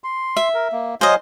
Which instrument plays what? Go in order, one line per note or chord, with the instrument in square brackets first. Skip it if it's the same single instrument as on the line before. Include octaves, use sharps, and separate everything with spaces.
[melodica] C6
[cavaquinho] E5
[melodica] A#4
A#3
[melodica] F#3 F5 G#5 [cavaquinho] C5 D#5